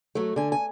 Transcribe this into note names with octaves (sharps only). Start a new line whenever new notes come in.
F#3 A3
D3 G#5
G#5